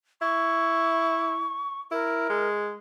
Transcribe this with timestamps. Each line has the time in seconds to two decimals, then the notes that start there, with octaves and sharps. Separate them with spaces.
0.22 E4 C#6
1.92 E4 A#4
2.30 G#3